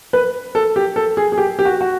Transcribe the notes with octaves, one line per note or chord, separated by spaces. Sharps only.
B4
A4
G4
A4
G#4
G#4
G4
G4
F#4
F#4